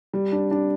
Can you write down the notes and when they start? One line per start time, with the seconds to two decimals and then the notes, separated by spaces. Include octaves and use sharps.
0.13 G3
0.32 D4
0.51 D4